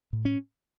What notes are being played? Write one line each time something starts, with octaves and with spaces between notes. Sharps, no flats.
A2
C#4